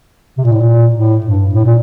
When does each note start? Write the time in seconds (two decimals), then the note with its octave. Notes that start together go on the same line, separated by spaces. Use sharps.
0.38 C3
0.45 A#2
0.52 A2
0.60 A#2
0.96 A2
1.26 G2
1.54 A2
1.65 A#2